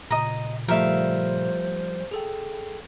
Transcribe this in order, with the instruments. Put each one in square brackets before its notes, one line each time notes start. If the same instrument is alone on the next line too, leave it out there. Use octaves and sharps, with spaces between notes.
[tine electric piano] A#2 C#3 [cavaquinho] D#5 A#5
[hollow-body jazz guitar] F3 G3 A3 [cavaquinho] A#4 E5 F5 [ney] C5
[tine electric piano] G#4 A4 G5